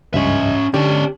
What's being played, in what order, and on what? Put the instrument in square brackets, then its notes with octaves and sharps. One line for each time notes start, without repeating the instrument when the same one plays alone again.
[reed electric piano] C#2 G2 D#5 [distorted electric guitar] C#4 E5
[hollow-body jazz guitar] D3 [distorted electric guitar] C#4 D5 [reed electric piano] G4